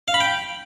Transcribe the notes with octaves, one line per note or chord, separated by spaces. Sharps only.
F5
B5
G5